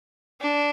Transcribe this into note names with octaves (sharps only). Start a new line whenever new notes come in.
D4